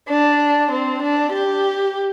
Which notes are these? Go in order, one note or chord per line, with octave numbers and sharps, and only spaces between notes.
D4
C4
D4
G4